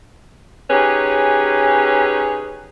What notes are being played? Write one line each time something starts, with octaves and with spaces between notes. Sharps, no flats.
C#4 D#4 G4 G#4 B4 C#5